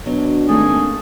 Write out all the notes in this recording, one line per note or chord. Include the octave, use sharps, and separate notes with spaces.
B2 F#3 D4
G#1 A3 A#3 D#4 G#4